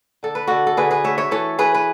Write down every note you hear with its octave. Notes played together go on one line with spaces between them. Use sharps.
D3 A4
B4
D3 F#4 A4
A4
D3 G#4 B4
G#4 B4
A3 C#5 E5
C#5 E5
E3 A4 C#5
E3 G#4 B4
B4